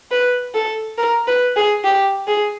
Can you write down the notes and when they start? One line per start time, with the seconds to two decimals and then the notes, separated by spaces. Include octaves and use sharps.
0.11 B4
0.54 A4
0.98 A#4
1.27 B4
1.56 G#4
1.84 G4
2.28 G#4